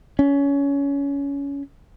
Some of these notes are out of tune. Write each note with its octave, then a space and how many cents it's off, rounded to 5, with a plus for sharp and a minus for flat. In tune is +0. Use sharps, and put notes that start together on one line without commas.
C#4 +20